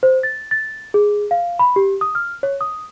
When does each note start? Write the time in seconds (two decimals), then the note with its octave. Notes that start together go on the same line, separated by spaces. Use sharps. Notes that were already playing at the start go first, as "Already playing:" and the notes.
0.03 C5
0.23 A6
0.51 A6
0.94 G#4
1.31 F5
1.59 B5
1.76 G4
2.01 D#6
2.15 F6
2.43 C#5
2.61 D#6